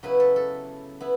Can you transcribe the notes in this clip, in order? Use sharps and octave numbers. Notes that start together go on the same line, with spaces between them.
C#3 F#3 B3 E4 B4
A4
A4
B3 E4